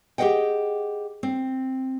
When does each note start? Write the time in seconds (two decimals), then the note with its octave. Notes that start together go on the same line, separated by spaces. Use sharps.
0.18 G4 G#4 C5 D#5 F#5 G5
1.23 C4